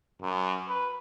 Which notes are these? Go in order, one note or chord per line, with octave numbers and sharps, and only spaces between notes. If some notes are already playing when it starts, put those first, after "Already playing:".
F#2
B4